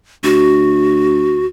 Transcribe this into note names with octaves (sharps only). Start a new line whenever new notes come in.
D2 F#4